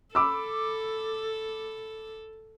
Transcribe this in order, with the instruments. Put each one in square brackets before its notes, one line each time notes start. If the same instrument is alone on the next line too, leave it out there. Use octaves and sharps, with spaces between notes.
[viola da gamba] A4 [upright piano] B5 D6 E6